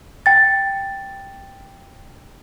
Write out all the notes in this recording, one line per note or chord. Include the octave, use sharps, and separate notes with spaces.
G5 A6